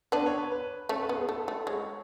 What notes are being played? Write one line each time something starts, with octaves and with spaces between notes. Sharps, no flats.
B3 D4 B4
C#5
B4
B4
A3 C#4 A4
B4
B3
G#4
A3 A4
A3
G#3 C#5